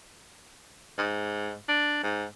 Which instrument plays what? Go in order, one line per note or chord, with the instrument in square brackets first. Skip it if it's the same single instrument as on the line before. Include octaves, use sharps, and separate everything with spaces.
[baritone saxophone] G#2
D4
G#2